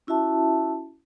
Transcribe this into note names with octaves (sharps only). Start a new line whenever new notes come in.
C#4 E4 F#4 E5 A5